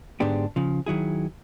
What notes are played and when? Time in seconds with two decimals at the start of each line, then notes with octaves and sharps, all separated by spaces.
0.20 G#2 D3 G#3 B3 D4 G4
0.56 C#3 F3
0.86 D#3 F#3 E4 G#4